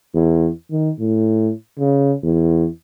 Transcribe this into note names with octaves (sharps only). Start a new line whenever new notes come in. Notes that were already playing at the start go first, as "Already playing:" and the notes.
E2
D#3
A2
C#3
E2